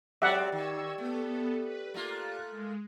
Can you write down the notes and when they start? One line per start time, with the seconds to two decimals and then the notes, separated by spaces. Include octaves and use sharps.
0.22 F#3 G#3 C4 G4 D5 E5 F#5 A6
0.52 D#3 C#6 E6 G#6
0.98 A3 B3 A4
1.63 B4
1.94 A3 A#3 F4 F#6
2.51 G#3